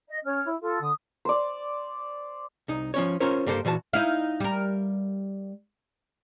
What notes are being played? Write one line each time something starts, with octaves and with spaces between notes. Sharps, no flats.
D#5
C#4 C#5 F6
E4
F4 A4
D3 D#6
C5 D5
C2 D#4
F3 C#4 C#5
C#4 F4 A#4 C5 C#5
G2 A#3 G4 A4 A#4 C5
A#2 E3 F#4 A5
D#4 E4 F5
G3 A#4